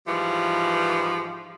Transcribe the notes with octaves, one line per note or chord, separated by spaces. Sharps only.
G#2 E3 F3 G3